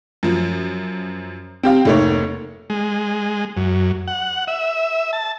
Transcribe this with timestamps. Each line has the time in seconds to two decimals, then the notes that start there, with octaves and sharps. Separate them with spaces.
0.23 F#2 F3
1.63 C4 G4 F5
1.85 F1 G#2 A3 A#3 C#5
2.70 G#3
3.57 F#2
4.08 F#5
4.48 E5
5.13 A5